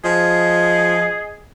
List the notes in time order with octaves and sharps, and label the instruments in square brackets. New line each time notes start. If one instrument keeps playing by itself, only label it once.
[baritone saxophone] F3 [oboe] G#4 [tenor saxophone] D#5